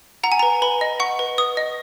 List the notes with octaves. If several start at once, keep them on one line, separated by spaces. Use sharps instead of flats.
F#5 A#5
G#5
B4 A#5
B4 B5
D#5
F#5 C#6
B4
B4 D#6
D#5